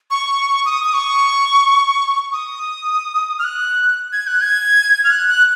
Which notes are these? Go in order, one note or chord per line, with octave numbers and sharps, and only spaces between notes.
C#6
D#6
D#6
C#6
D#6
F6
F#6
G#6
F#6
G#6
F6
F#6
F#6